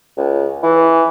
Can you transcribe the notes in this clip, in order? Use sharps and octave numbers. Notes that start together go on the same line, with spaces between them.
C#2
E3